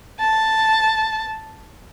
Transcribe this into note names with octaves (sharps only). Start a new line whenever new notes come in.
A5